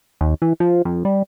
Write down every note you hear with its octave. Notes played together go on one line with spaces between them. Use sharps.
D#2
E3
F3
F2
G3